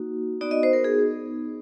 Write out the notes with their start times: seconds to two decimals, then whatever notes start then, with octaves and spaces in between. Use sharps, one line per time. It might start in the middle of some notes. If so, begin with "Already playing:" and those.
Already playing: A#3 D#4 F#4
0.41 B3 D#4 F#4 D5
0.51 D#5
0.63 C5
0.73 A#4
0.84 G#4